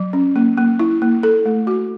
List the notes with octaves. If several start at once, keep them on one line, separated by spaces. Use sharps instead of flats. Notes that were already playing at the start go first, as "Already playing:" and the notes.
Already playing: F#3
C#4
A#3
A#3
E4
A#3
A4
A3
F#4